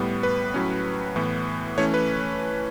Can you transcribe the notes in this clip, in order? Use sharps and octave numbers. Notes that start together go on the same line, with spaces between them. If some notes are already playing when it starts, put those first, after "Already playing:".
Already playing: A2 G3 B3
B4
A2 F#3 C#4
A2 E3 B3
E3 A3 C#4 C#5
B4